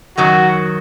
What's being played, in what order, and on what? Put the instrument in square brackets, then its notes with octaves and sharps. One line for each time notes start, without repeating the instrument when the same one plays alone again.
[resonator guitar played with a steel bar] F#2 D#3 F#3 [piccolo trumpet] F#4